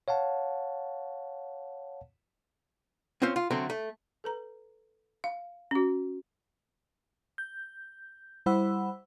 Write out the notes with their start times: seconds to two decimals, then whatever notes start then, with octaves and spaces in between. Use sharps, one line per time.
0.08 C#5 F5 F#5 A5
3.22 C4 C#4 F4 C5 C#5
3.36 F4
3.51 D3 F#3 A3 C4
3.70 A3
4.24 A4 B4 A#5
5.24 F5
5.71 C#4 F#4
7.38 G6
8.46 G3 E4 C5 F#5 B5 E6